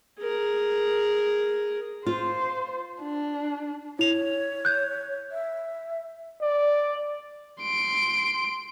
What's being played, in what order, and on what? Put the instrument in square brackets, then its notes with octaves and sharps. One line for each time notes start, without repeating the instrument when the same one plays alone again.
[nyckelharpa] G#4 A#4
[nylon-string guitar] F4 [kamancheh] C5
[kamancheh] D4
[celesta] E4 F7 [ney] C#5
[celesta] F#6 G6
[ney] E5
[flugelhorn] D5
[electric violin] C6 D7